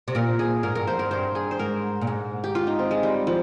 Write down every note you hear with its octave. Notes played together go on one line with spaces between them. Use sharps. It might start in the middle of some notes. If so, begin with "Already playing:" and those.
C3
A#2 A#4
G#4
G#2 A#4
G2 A#4
F2 C5
G2 A#4
G2 C5
G#4
C5
G#2 A#4
A#2
G#2
G4
F4
D#4
C4
G#3
G3
F3